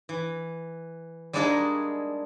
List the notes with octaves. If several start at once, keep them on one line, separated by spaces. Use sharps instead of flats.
E3
G3 G#3 A#3 D4 D#4 G#4